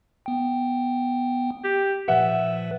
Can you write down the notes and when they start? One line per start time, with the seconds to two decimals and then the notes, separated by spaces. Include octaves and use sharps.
0.26 B3 G5
1.64 G4
2.08 A#2 F3 B4 E5 F#5